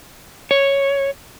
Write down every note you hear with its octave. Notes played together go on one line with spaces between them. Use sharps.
C#5